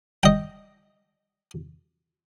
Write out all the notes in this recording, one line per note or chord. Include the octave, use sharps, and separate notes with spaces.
D#5 G5